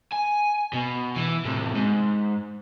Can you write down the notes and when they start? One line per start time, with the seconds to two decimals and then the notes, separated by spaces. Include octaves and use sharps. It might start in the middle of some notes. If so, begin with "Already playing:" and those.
0.12 G#5
0.73 B2
1.16 E3
1.45 A2 C3
1.75 G#2